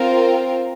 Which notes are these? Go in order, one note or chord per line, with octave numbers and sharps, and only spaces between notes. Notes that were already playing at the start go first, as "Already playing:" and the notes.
Already playing: C4 F4 A#4